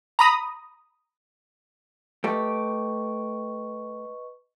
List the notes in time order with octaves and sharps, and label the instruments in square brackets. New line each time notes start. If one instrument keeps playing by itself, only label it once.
[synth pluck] A#5 B5 D#6 A#6
[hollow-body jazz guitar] A3 G4 [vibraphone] B4 D#5 C#6